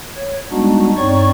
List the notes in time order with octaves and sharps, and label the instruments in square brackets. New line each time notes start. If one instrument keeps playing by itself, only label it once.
[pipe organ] C#5
G3 G#3 B3 D4 D#4 F#4
G2 C4 D#4 C#5 D5 C#6